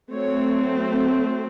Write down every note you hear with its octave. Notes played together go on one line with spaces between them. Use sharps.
F#3 A3 C4 C#5